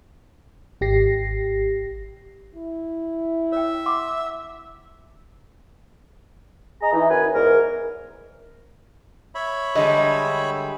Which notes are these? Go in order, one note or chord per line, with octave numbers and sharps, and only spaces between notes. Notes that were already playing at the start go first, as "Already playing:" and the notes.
G#1 G4 A#6 C7
E4
C#5 E5 G5
F#5 C6 D6
G#4 D#5 A#5
E3 D#4
F#2 B4 G#5
E2 G#2 A#4
C#5 E5 B5
D3 G3 G#3 D#5